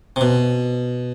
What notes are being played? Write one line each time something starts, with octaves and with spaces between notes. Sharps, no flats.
C3
B2